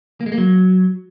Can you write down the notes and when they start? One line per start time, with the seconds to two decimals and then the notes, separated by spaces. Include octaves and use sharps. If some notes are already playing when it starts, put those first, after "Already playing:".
0.21 A#3
0.26 G#3
0.32 A#3
0.38 F#3